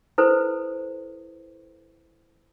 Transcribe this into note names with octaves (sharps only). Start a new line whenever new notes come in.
E4 A4 B4 C5